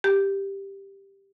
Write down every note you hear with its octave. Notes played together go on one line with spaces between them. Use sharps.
G4